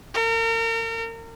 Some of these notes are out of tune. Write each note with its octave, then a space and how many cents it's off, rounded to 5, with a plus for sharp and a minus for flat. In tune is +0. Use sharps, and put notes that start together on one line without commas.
A#4 -40